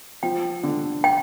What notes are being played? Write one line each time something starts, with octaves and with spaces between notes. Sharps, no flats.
F3 G5
D3
G5